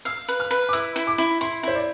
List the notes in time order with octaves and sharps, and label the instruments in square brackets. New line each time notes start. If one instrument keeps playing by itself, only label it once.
[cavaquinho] F5 [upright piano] E6
[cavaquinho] B4
[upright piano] F6
[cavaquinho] B4
[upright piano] D6
[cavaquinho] E4 [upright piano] E6
[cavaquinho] E4
[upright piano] D6
[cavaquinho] E4
[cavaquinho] E4 [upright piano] C6
[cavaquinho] E4 [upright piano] C5
[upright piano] D5